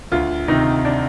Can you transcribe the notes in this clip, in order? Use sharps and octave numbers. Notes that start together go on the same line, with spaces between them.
D2 F4
C3 D#3 D#4
D4